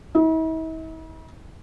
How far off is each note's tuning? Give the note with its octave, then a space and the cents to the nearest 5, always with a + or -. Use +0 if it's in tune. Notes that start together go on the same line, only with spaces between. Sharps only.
E4 -45